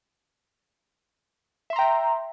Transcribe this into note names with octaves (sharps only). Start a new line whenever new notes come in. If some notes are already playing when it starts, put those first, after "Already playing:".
E5 G5 A#5 C6